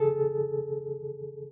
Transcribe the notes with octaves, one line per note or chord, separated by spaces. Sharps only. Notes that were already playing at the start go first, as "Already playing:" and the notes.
Already playing: C#3 G#4 A4